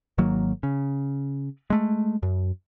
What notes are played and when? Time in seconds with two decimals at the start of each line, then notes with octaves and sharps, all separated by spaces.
0.18 G#1 D#3 F#3 A#3
0.63 C#3
1.70 G#3 A3
2.23 F#2